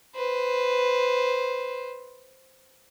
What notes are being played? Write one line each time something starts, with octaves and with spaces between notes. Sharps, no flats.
B4 C5